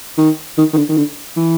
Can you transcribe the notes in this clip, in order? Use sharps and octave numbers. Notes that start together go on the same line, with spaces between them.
D#3
D#3
D#3
D3
D#3
D3
E3